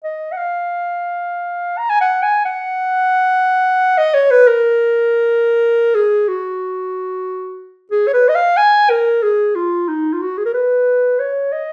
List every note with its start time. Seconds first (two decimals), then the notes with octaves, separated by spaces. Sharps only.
0.04 D#5
0.32 F#5
0.37 F5
1.78 A#5
1.89 G#5
2.01 F#5
2.23 G#5
2.45 F#5
3.98 D#5
4.14 C#5
4.31 B4
4.47 A#4
5.95 G#4
6.28 F#4
7.91 G#4
8.07 C#5
8.13 B4
8.28 D#5
8.35 F5
8.57 G#5
8.90 A#4
9.23 G#4
9.55 F4
9.88 D#4
10.13 F4
10.21 F#4
10.38 G#4
10.46 A#4
10.54 B4
11.19 C#5
11.52 D#5